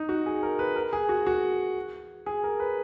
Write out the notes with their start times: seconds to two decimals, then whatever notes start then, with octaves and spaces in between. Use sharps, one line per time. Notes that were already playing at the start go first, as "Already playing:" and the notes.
Already playing: D#4
0.09 F#4
0.26 G#4
0.43 A#4
0.59 B4
0.76 A#4
0.93 G#4
1.09 F#4
1.27 F#4
2.26 G#4
2.44 A#4
2.59 B4